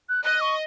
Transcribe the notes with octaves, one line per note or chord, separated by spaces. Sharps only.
F#6
D#5 F#6
C#6